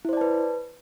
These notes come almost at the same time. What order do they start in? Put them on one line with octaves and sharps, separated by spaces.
E4 C5 D5 A5 B4